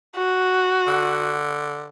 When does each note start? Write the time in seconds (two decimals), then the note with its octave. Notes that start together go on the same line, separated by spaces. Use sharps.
0.16 F#4
0.87 D3